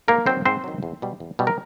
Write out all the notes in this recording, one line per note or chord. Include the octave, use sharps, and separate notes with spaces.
G#2 A#3 A#4
D#3 F#3 C4 C5
G#2 C4 C5
D#3 F#3
E2
B2 G3
E2
B2 G3
A#4